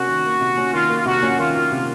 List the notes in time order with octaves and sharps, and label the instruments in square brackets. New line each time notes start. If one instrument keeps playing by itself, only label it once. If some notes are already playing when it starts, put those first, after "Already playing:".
Already playing: [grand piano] C3 A#3 C#4 [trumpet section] F#4
[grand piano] D#3
A#3
C3
C#4
[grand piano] D#3 [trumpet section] F4
[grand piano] A#3
[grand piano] C3 [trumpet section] F#4
[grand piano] C#4
[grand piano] D#3 [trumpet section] F4
[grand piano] A#3
C3